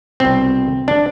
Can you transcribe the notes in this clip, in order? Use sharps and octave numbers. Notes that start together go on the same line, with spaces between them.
C2 B2 C4
D4